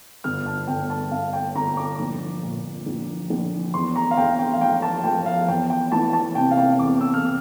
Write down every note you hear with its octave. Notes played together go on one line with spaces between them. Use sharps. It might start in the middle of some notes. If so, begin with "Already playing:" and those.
G1 F6
A5
G1 G5
A5
G1 F5
G5
G1 A#5
D6
A#1
A#2
A#1
A#1
E2 C6
A#5
F5
E2 G5
G5
F5
F3 G5
A5
F3 G5
F5
E2 G5
G5
E3 A5
A5
C3 G5
F5
G5
E2 D6
E6
F6
C3